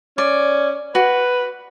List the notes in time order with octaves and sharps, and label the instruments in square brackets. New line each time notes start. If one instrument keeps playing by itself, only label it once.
[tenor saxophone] C#4 [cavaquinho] D5
[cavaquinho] F#4 [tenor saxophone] B4